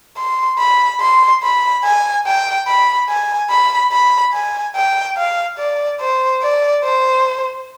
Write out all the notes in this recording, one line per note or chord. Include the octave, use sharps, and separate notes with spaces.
C6
B5
C6
B5
G#5
G5
B5
G#5
B5
B5
G#5
G5
F5
D5
C5
D5
C5